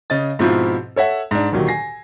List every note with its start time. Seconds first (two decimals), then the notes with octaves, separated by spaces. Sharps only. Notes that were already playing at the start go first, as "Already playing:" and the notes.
0.10 C#3 D#5 A6
0.39 G#2 B2 F3 C4 E4 F4
0.96 A4 C#5 E5 F#5
1.31 G#2 D4
1.52 D2 A#2 D#3 F#3 G4
1.68 G#5 A#6 C7